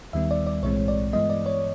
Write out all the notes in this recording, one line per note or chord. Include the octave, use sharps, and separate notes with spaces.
D#2 D#3 G3 B3 E5
D5
D5
B1 A2 E3 G#3 C4 C#5
D5
G2 E3 G#3 B3 D#5
D5
C#5